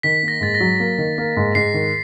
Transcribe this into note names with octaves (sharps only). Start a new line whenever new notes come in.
D#3 B6
A#3
A#6
G#2 A6
A#6
F#3
A#3
D#3
A#3
G#2
G#2 C7
D#3